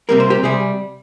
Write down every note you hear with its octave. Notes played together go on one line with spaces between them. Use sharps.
C3 G3 A#3 A#4
C5
G4 A#4
C3 G3 G#4 C5